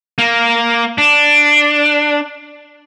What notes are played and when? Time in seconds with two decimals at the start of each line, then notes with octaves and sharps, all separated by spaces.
0.18 A#3
0.98 D4